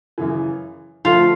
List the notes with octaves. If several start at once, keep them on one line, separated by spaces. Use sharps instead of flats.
F#2 C#3 E3
D3 F3 A3 F4